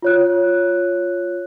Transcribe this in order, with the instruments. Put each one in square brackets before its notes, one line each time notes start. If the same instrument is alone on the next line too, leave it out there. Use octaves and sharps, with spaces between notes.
[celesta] F4 C#5 F#6